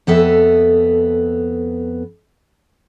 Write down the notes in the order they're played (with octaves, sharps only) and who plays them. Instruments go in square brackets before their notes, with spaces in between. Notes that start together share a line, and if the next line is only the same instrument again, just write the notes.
[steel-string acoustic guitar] F2 B3 A4 E5